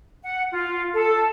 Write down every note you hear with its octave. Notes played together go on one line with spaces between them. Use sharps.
F#5
F4
A4